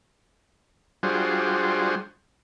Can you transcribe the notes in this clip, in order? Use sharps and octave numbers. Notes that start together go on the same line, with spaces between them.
G3 D4 F4 F#4 G#4 C5